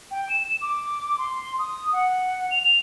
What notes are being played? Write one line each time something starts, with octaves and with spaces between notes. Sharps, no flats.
G5
E7
D6
C6
D#6
F#5
F7